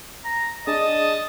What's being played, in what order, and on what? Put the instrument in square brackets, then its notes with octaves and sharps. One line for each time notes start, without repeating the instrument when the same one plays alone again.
[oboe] A#5
[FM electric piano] D4 G#4 D5 [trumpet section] D#5 [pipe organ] A5 [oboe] D#6